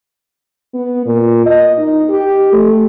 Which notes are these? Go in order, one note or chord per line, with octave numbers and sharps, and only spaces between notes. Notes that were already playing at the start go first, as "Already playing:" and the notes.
B3
A#2
D#5
D#4
G4
A3